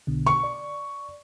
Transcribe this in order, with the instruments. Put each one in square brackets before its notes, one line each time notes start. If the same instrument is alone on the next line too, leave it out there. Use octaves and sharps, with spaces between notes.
[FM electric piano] B1 B2 D3
[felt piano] C#6
[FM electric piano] D5